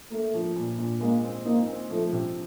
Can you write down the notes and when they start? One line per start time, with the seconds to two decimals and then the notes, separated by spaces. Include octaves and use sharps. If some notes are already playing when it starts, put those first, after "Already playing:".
0.11 A3 A#3
0.34 F3
0.56 A#2
0.79 A#2
1.01 G#3 A#3
1.23 C4
1.45 A#3 D#4
1.68 C4
1.90 F3 A3
2.12 C3